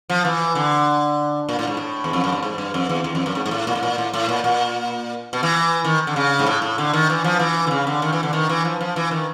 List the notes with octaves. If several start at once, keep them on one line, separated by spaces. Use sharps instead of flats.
F3
E3
D3
A#2
A2
G#2
A2
E2
F2
F#2
G2
G#2
G2
F2
E2
E2
F2
F#2
G#2
G#2
A2
A#2
A2
A#2
A2
A2
A#2
A#2
B2
E3
D#3
D3
C#3
G#2
A2
A2
D3
D#3
E3
F3
E3
D3
C#3
D3
D#3
E3
D3
D#3
E3
F3
F3
E3
D#3